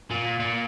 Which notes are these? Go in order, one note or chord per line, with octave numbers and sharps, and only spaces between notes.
A#2
A#2